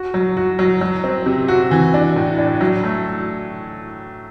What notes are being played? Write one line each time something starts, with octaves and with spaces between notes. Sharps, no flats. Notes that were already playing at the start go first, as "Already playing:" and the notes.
Already playing: F#4
F#3
F#4
F#3
F#3
C4
C3
F#4
E3
D4
A2
D4
F#3
A3